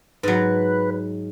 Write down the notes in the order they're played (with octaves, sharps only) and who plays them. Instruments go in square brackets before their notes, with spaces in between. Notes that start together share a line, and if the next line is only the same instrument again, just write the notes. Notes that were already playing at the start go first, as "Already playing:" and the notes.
[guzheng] G#2 F#3 [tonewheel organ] B4